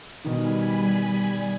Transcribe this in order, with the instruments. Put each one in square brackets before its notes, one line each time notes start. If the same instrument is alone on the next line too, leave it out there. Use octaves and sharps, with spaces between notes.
[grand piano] B2 D#3 [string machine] G3 G#5 B5